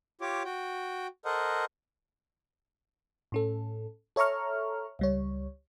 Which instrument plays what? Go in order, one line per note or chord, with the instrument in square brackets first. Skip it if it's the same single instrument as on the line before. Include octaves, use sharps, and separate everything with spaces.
[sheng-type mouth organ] F4 G4 C#5 D6
F#4 G5
A4 A#4 C5 D#5 F#5
[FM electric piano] A2 C#4 A4
A4 C#5 E5 A#5 C#6 F6
C#2 G3 C#5